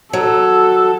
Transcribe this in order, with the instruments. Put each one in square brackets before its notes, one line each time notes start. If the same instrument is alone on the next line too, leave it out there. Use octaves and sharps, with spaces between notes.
[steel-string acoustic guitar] F#3 [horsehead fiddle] A4